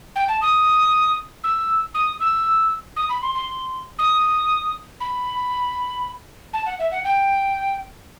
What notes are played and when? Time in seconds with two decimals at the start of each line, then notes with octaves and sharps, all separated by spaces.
0.16 G5
0.28 A5
0.41 D#6
1.44 E6
1.94 D#6
2.20 E6
2.96 D#6
3.09 B5
3.22 C6
3.35 C6
3.99 D#6
5.00 B5
6.53 A5
6.66 F#5
6.79 E5
6.91 F#5
7.04 G5